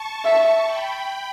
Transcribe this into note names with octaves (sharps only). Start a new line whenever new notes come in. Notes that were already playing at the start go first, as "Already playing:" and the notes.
Already playing: A5 C#6
E5
G5 B5